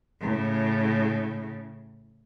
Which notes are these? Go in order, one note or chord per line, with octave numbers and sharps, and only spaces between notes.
A2 C#3